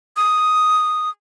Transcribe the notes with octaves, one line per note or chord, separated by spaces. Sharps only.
D#6